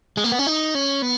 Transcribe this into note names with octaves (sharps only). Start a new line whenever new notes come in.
G#3
A#3
B3
C#4
D#4
C#4
B3